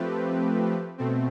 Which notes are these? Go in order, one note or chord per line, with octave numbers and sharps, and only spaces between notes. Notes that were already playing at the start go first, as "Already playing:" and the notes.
Already playing: F3 A3 C4 G4 B4
B2 A3 C4